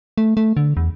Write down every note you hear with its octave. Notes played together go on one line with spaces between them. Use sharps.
A3
A3
D3
E2